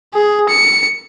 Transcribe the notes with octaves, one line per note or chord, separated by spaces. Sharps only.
G#4
C#7